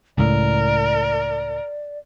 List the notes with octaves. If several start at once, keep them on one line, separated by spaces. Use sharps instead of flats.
C#2 A2 A#4 D5